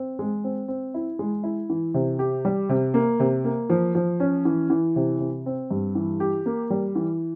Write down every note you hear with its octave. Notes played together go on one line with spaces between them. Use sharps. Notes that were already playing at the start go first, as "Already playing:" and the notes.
Already playing: C4
G#3
C4
C4
E4
G#3
E4
E3
C3
G4
G3
C3
A#3
C3
A#3
F3
F3
C#4
E3
E3
C3
C3
C4
G2
E3
G4
A#3
G3
E3